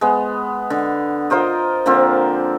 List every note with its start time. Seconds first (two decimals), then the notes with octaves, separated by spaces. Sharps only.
0.01 G#3 B3
0.70 D3
1.30 F4 A#4 C5 D#5
1.86 D3 F3 A#3 C4